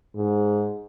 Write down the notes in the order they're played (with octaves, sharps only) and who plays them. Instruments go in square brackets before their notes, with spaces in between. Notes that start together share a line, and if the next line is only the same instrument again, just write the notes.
[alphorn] G#2